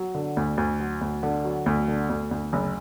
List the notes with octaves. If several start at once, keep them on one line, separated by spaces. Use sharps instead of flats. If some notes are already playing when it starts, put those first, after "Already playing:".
Already playing: F#3
D3
D2
D2
F#3
D2
D3
F#3
D2
D3
D2
D2
F#1